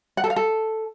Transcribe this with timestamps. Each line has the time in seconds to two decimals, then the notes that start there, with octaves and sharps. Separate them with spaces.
0.17 F#5
0.24 A4
0.30 F5
0.36 A4